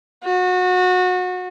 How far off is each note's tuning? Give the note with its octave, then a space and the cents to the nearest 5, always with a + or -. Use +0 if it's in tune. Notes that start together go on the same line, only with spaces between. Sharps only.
F#4 -25